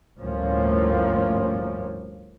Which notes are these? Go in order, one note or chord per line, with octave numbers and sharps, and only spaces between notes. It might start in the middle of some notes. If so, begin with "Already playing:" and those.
G1 D2 A2 F3 A#3 C#4